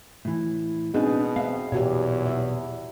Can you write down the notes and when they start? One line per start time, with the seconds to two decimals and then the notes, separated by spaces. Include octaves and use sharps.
0.25 A2 E3
0.94 B2 C4 D4 D#4 G#4
1.36 C4 E5 F5
1.72 B1 E2 A#2 F#4 G4 C#5
2.26 E4 E5